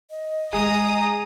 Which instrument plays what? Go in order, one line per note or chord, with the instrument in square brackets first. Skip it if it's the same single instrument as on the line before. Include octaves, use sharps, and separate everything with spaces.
[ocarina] D#5
[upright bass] G#3 [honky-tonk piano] G#4 [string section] A#5 D#6